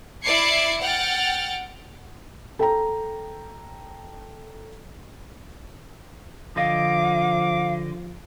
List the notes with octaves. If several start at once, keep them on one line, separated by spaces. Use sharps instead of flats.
E4 D5 D6 G#6 C7 C#7
F#5 G5 F6 A6
A4 G5 A#5
D3 F3 D#5 F5 D6